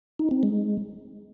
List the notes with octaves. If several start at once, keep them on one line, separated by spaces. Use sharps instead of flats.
D#4
C4
G#3